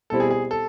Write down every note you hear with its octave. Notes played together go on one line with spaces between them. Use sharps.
B2 G3 C4 E4 A4
G#4
G#4
A4